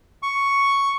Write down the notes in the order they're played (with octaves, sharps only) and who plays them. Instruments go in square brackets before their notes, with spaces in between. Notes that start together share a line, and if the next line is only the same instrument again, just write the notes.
[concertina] C#6